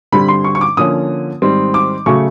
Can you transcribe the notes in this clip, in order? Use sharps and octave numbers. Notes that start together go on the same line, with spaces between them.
G2 D3 G3 C4 B5
C6
C#6
C#6
D6
D3 F3 A#3 C#4 D#6
G#2 D#3 G3 C4
D6
C#3 F#3 A3 C#6